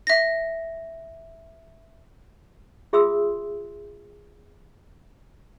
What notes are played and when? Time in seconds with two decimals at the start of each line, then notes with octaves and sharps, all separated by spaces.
0.07 E5 A#6
2.93 F4 G#4 E5 C6 D#6 E6